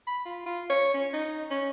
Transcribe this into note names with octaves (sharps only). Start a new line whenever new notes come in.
B5
F4
F4
C#5
C#4
D#4
C#4